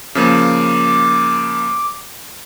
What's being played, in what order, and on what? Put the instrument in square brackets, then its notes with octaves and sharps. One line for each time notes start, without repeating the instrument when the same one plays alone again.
[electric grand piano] C#3 F3 A#3 [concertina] D6